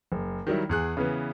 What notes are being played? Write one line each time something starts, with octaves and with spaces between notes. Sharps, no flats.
F#1
D#3 F#3 G3 E4
E2 G#4 F#6
C#3 E3 B3